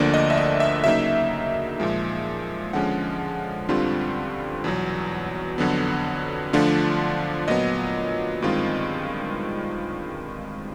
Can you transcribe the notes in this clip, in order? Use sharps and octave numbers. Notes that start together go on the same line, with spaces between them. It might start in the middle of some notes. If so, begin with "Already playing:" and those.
Already playing: D2 D3 F3 A#3 D4 D5
D#5
E5
D#5
E5
C#3 F#3 A#3 D#4 E5
A#2 F3 G#3
D3 F3 G#3 C#4 F#5
G2 D3 G3 C4 F4
E2 B2 F#3
F2 D3 F#3 B3
D3 F3 A3 D4 F4
A#2 F#3 B3 D#5
G2 D#3 G#3 C4 F4